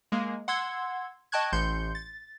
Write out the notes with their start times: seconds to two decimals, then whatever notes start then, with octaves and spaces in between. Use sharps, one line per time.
0.12 G#3 A#3
0.48 F#5 C6 E6 G#6
1.32 D#5 G5 A5 C#6 F#6 G#6
1.53 A1 C6 G6 C#7
1.95 A6